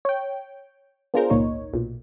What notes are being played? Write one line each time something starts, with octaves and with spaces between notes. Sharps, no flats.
C#5 G5
B3 D4 F4 G#4 A#4 C5
G#1 C#2 A#2 A#3 D#4 C#5
B1 A#2